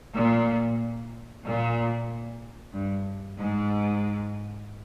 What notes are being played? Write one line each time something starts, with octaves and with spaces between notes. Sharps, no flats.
A#2
A#2
G2
G#2